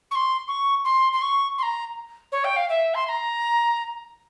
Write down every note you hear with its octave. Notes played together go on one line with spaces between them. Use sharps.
C#6
C6
C#6
C6
C6
C#6
C6
A#5
C#5
G5
F5
E5
C6
C6
A#5